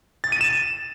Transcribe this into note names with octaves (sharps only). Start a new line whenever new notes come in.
A6
D#7
E7